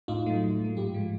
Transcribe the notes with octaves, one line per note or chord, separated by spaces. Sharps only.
A2 D#4 F4
F#3 A3
A2
F#3 A3
G#2 F4 G4
F3 G#3